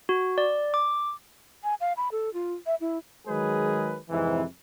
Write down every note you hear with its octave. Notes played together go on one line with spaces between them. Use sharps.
F#4
D5
D6
G#5
F5
B5
A4
F4
E5
E4
D#3 F#3 G#3 G#4 A#4 B4
F2 G#2 C3 E3